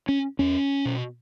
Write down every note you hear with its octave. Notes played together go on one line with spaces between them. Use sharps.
C#4
E2 C#4
B2